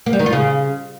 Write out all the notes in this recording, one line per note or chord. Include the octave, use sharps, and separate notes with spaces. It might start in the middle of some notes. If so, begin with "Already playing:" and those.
A#3
G3
D#3
F4
C#3